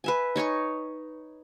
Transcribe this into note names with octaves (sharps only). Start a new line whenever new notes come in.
B4 E5 G#5
D#4 C#5 G#5 C#6